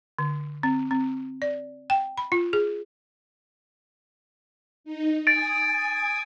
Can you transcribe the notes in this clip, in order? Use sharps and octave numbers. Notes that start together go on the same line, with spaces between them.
D3
C4
C4
D5
G5
B5
F4
G#4
D#4
G#5 D#6 A6 D7